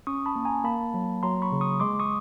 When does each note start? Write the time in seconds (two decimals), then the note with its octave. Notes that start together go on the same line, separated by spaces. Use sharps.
0.07 C#4 C#6 D#6
0.26 A5 B5
0.36 A#3
0.45 G#5 A#5
0.64 A#3 A5 B5
0.94 F#3
1.23 F#3 A#5 C6
1.42 B5 C#6
1.52 C#3
1.61 C#6 D#6
1.80 G#3 C6 D6
1.99 C#6 D#6